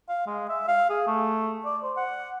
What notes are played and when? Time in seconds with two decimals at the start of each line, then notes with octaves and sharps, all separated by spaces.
0.09 F5
0.26 G#3
0.49 E5
0.68 F5
0.90 G#4
1.07 A3
1.65 D5
1.83 C5
1.97 F#5